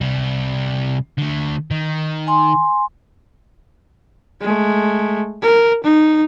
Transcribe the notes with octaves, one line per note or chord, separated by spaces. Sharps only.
C3 G3
D3 A3
D#3
G#5 C6
G#3 A3
A#4
D#4